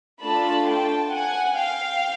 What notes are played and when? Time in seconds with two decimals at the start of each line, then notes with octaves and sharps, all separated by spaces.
0.22 A3 D4 F4 A5 B5
0.67 G5 A5
1.13 F#5 G#5
1.57 F5 G5